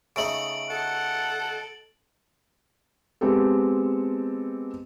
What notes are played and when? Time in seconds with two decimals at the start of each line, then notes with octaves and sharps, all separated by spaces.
0.16 C#3 A3 D#4 D7 F#7
0.71 A4 F#5
3.21 G#3 B3 C4 G4 A4